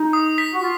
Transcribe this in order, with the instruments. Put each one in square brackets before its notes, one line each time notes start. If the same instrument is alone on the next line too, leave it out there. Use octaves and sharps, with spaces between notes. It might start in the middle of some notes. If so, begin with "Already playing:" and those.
Already playing: [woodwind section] D#4
[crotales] D#6
B6
[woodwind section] F#4
F4